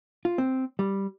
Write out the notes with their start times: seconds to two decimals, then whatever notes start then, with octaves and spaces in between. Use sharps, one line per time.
0.25 F4
0.38 C4
0.79 G3